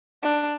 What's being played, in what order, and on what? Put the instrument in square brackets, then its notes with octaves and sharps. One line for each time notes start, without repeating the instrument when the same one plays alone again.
[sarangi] D4